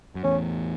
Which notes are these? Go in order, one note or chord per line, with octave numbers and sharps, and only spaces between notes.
F#2
E2 A2 C#4